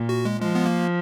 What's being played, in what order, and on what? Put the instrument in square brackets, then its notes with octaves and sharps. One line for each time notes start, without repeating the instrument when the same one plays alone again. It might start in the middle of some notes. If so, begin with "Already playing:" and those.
Already playing: [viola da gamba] A#2
[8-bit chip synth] F#4
G#3
[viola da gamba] F3 [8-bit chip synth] G#3
[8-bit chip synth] B3
A#3